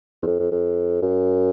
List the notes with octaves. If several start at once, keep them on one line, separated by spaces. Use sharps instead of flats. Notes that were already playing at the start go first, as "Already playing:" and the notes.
E2
F2
F2
F2
F#2